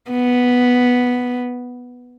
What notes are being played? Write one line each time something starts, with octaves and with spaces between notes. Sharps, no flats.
B3